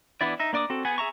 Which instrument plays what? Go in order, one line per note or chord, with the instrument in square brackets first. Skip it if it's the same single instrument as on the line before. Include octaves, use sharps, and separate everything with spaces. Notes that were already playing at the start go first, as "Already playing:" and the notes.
[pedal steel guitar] E3 B3 D4 E4 D5
D#4 E5
A#3 D4 D5 D6 D#6
C4 F#4 A4
B3 G#4 F#5 G#5
G#4 E5 A#5 C#6